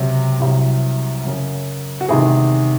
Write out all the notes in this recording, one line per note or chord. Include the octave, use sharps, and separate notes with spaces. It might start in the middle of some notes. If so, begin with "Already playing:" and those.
Already playing: C#2 C3 F#3
C2 C3 F#3
F#2 C#3 F#3
F#4
E2 C3 D#3 G#3 G#4